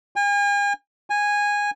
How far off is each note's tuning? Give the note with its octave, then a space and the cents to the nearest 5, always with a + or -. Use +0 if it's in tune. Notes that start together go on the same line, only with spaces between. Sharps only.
G#5 -40
G#5 -10